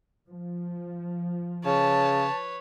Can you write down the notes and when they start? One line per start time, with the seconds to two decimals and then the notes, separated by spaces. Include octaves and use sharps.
0.26 F3
1.65 C#3 B4 C#5 A5